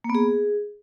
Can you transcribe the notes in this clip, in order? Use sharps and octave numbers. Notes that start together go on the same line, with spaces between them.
A#3
B3
G#4